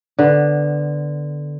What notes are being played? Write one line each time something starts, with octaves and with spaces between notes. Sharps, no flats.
D3 B3